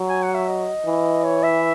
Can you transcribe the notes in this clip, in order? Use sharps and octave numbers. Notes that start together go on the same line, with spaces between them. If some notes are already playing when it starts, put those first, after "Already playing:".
Already playing: F#3
G#5
F#5
E5
D#5
E3
C#5
E5